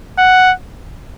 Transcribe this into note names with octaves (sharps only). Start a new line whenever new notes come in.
F#5